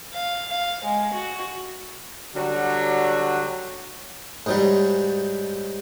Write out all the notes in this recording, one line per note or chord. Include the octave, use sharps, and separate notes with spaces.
F5
F5
G#3
F#4
D3 F#3 G3 F#4
G#2 F#3 G3